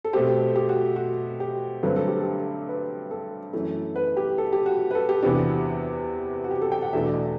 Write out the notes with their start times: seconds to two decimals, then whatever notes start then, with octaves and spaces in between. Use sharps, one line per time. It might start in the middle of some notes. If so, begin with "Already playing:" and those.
0.05 A4
0.13 B2 A3 C4 G4
0.56 G4
0.69 F#4
0.96 F#4
1.40 G4
1.83 G2 D3 F#3 A3 C4 B4
1.96 A4
2.08 G4
2.20 A4
2.69 B4
3.11 A4
3.53 F#2 E3 A3
3.96 B4
4.17 G4
4.38 A4
4.53 G4
4.66 F#4
4.91 B4
4.95 A4
5.09 G4
5.23 E2 C3 E3 B3 D4 F#4
6.44 F#4
6.51 G4
6.61 A4
6.72 G5
6.82 F#5
6.93 E2 B2 A3 D4 E5
7.03 D5
7.14 D5